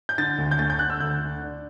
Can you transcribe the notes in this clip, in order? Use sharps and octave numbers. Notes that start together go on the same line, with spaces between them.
G6
D3 A6
D2
G6
A3 A6
G6
D3 F#6
E6
D2 G6
D3
D4